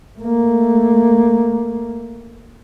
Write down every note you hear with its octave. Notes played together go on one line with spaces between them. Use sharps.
A3 A#3